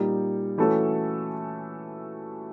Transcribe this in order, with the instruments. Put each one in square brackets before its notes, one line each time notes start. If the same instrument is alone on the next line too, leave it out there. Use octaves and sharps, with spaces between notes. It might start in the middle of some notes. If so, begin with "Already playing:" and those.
Already playing: [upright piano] A#2 G3 A#3 D#4 G4
E3 A3 C#4 F#4 A4